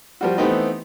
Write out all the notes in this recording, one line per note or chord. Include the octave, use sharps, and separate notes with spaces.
F3 G3 F#4
E3 A3 B3 C4 D#4 G4